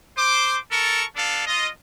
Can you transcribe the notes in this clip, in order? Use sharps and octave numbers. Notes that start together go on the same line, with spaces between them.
C5 D6
A4 A#4 A5 C#6
B3 D4 A4 F5
F4 D#5